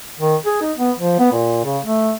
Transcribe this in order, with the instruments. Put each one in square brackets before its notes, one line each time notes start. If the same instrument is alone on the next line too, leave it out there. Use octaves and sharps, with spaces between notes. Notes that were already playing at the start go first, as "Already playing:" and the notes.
[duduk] D#3
G#4
D#4
B3
F3
B3
A#2
C#3
A3